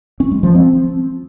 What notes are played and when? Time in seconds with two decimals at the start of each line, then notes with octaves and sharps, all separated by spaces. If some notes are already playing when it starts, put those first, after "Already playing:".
0.20 C#4
0.32 G#3
0.43 F3
0.55 C4